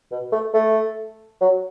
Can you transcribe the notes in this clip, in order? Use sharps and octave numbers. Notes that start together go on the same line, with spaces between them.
B2
A3
A3
F#3